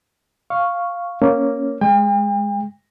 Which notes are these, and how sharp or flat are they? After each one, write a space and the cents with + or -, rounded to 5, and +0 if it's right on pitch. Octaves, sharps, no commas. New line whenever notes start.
F5 +0 C#6 +0
A#3 +0 C#4 +0
G#3 -5 G5 +45